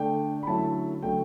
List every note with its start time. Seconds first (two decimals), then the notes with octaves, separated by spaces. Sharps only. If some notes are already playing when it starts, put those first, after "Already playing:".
Already playing: D3 A3 D4 G5
0.43 B5
0.47 D3 F#3 A3 C#4 E4 A5
1.03 D3 F#3 A3 G5